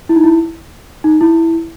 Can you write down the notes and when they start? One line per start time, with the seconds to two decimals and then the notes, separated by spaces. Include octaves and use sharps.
0.09 E4
0.16 D#4
0.24 E4
1.04 D#4
1.21 E4